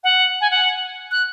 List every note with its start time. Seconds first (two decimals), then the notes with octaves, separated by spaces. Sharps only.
0.04 F#5
0.41 G#5
0.51 F#5
1.11 F#6